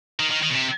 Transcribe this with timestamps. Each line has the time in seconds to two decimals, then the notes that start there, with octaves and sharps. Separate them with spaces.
0.20 D#3
0.31 D#3
0.43 D#3
0.50 B2
0.55 C3